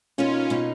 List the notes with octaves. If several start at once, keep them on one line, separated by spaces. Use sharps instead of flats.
B2 A#3 C#4 D#4 F4
B2 A#3 D#4